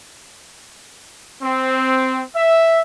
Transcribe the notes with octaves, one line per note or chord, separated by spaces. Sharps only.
C4
E5